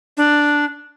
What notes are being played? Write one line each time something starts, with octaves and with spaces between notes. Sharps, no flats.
D4